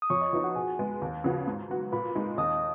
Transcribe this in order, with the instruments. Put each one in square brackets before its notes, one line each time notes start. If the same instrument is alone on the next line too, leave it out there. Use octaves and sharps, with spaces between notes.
[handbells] D#6
[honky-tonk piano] F2 [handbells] C#5 C#6
[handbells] D#5 D#6
[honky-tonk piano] F3 B3 D#4
[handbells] F#4 F#5
[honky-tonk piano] B2 [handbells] G#4 G#5
[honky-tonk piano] G#3 B3
D#2
C#3 F3 B3 F#4
G#2
F#3 B3 F#4
[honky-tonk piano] A#2 [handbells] B4 B5
[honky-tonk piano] G#3 D#4
[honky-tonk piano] D#2 [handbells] D#5 D#6